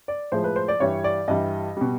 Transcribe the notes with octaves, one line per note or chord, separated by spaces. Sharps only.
D5
A2 F3 G#3 C5
B4
C5
D5
G2 E3 G3 C#5
D5
G2 E3 G3 D#5
B2 G3